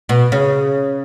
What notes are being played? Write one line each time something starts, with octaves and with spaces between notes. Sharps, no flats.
B2
C#3